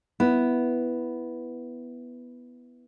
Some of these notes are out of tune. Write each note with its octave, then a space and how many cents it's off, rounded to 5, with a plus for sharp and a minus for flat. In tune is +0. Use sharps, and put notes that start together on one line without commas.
B3 +0 E4 +0